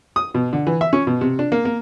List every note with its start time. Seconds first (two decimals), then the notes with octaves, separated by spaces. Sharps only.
0.16 D#6
0.34 B2
0.53 D3
0.67 E3
0.81 E5
0.93 C#4
1.07 B2
1.21 C3
1.39 D4
1.52 A#3
1.65 A#3